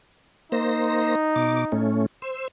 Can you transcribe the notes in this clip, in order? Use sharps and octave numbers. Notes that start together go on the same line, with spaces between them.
A#3 D#4 C5 A#6
B2 D6
A2 A3 C#4
C5 E6